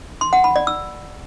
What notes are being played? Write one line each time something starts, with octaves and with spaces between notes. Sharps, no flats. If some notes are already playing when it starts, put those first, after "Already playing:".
C6
F#5
B5
D5
E6